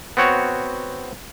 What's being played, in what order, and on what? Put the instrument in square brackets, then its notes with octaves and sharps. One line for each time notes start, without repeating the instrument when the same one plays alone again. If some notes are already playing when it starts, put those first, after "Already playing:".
[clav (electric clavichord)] B3 C4 F#4 C#5